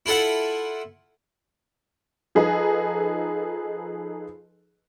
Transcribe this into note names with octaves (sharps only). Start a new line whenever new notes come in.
E4 F4 A4 E5 F#5
F3 D#4 G#4 A4 B4 D#5